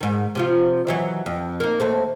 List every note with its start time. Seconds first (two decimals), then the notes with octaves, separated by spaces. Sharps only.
0.01 G#2 D#3
0.35 C3 F3 F4
0.87 D#3 E3 F#3
1.26 F2
1.60 A#3 D#4
1.80 D#2 A3 C4